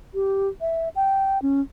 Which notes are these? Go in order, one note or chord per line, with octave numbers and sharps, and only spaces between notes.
G4
E5
G5
C#4